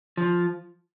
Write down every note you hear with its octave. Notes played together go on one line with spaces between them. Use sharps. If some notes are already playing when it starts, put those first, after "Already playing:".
F3